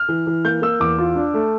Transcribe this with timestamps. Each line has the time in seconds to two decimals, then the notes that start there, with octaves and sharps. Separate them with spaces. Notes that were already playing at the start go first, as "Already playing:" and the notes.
Already playing: F6
0.09 E3
0.27 E3
0.45 A#3 G6
0.62 A#3 E6
0.80 E2 D6
0.98 F4
1.15 D4
1.34 A3